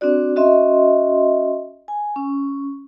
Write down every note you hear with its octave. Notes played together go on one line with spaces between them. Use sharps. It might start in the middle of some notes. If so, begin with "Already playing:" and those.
C4 D4 F#4 D5
C#4 F#4 D#5 E5 C6
G#5
C#4